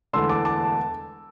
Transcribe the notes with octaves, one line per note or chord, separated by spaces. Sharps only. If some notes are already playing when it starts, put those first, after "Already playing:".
E1 E2 D3 A3 C6 E6
A5 D6
A5 D6